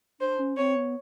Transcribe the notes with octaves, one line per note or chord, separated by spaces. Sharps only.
D4 C5
C#4
C4 C#5
B3